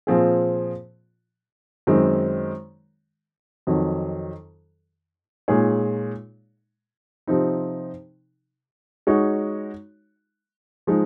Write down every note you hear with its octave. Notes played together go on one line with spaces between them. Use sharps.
A#2 F3 C4 F4 G#4
F#2 D#3 G#3 C4
F2 D#3 F#3
A#2 G#3 D#4 G#4 C#5
C3 F3 C4 D#4
G#3 D#4 F#4 C#5
F3 G#3 D#4